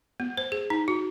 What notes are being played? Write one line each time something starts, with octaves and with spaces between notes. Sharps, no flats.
B3
C5
G#4
D#4
F#4